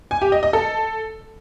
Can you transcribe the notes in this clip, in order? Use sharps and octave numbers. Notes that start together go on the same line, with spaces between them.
G#5
G4
D#5
D#5
A4